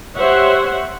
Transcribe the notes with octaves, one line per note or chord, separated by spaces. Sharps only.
G4 C5 C#5 E5 F#5